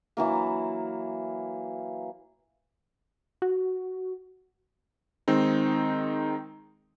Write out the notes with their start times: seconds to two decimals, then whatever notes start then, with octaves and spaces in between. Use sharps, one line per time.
0.17 E3 F#3 A#3
3.42 F#4
5.28 D#3 G#3 C4 D#4